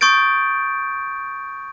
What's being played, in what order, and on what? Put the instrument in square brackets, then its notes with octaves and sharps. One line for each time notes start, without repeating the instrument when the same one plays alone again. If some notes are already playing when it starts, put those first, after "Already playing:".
[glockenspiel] C#6 D#6 G6 A6 D7